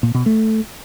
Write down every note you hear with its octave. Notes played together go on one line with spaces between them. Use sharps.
A#2
B2
A3